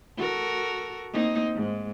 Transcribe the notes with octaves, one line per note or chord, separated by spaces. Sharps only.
F#4 A4 A#4
A#3 C4 D#4
G#2